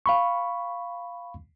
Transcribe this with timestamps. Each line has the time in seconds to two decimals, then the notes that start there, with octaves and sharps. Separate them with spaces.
0.06 F5 B5 C#6